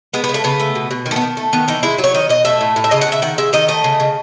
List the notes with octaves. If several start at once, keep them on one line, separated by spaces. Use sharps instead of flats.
G#3 B3
B3
C#3
A3
C#3 B3
A3
B2
B2
D#3
A3
B3
D#3
A3
D#3 B3
E3 D#4
G#3 E4
F#3
C#5
D#3 D#5
B2 D#5
A3 E5
A2
A2
E5
C#3 D#5
F#5
C#3
E5
D#3 F#5
G#3 E5
D#3 D#5
A3 D#5
C#3
C#3